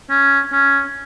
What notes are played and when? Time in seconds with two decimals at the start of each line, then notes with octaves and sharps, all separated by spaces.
0.10 C#4
0.53 C#4